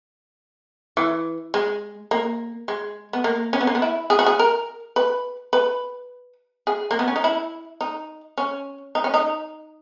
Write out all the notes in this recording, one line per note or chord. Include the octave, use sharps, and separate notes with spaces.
E3
G#3
A#3
G#3
B3
A#3
C#4
B3
A#3
B3
E4
G#4
F#4
G#4
A#4
B4
B4
G#4
A#3
B3
C#4
D#4
E4
D#4
C#4
D#4
C#4
D#4